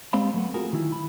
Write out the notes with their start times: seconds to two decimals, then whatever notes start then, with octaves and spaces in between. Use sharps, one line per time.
0.13 G3 G#3 C4 C5 F5 B5
0.34 F#3 A3 B3
0.54 F4 F#4 G#4 A#4
0.73 D#3 E4
0.92 B5